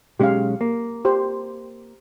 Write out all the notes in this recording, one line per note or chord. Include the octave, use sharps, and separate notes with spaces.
B1 G#3 C#4 G4 F5
A#3
G4 C5